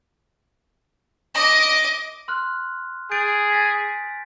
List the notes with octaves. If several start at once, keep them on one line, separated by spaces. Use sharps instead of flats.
D#5 D6
C6 F6 F#6
G#4 G6 A6 D7
G#5 A6 B6